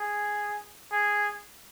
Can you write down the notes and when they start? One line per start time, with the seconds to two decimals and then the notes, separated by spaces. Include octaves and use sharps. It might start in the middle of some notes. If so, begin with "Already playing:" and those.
Already playing: G#4
0.92 G#4